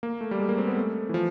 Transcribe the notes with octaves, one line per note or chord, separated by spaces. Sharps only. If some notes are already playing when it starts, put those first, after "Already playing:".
A#3
A3
G3
G#3
A#3
C4
B3
A3
E3
F3